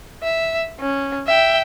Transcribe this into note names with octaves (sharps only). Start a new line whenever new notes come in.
E5
C#4
E5 G5